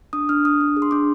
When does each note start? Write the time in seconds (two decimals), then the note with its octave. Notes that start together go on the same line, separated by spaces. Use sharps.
0.13 D4 D#6
0.29 D4 F6
0.44 D4 D#6
0.61 D4
0.77 G#4
0.82 C6
0.91 D4 D6